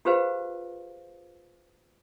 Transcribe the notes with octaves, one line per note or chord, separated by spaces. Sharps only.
F4 G4 G#4 B4 C5 F5